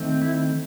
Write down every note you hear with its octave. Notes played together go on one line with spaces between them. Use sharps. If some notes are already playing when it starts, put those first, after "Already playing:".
Already playing: D#3 A3 C4
E4